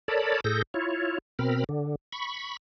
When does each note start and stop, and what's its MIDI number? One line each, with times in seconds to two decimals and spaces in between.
0.08 0.40 69
0.08 0.40 70
0.08 0.40 73
0.08 0.40 74
0.08 0.40 81
0.08 0.40 83
0.44 0.62 45
0.44 0.62 68
0.44 0.62 69
0.44 0.62 91
0.44 0.62 94
0.74 1.18 64
0.74 1.18 65
0.74 1.18 73
1.39 1.64 47
1.39 1.64 60
1.39 1.64 70
1.39 1.64 83
1.39 1.64 89
1.69 1.95 50
2.12 2.57 83
2.12 2.57 85